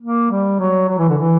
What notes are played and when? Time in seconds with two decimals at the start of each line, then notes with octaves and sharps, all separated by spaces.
0.01 A#3
0.31 G3
0.60 F#3
0.89 F#3
0.98 E3
1.09 D3
1.18 E3